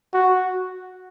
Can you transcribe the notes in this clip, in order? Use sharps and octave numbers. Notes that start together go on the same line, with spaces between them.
F#4